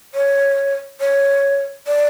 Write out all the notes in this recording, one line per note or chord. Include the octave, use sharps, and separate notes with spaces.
C#5
C#5
D5